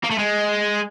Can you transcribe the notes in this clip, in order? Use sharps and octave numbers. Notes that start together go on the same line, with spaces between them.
A#3
A3
G#3